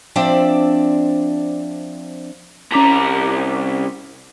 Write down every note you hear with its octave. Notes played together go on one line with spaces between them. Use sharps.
F3 C4 D4 D5 E5
C2 C#4 A#5 D6 B6